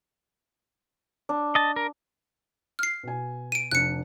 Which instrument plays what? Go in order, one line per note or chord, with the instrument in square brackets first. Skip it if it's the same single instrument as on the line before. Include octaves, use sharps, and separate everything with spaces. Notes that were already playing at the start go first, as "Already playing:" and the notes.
[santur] D4
[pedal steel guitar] D#5 A5
A#4
[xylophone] F6 C7
[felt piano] B2 G#5
[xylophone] D7 D#7
[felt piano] F1 D4 [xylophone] F#6 C#7